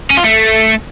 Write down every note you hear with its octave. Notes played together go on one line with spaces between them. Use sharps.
C#4
F4
A3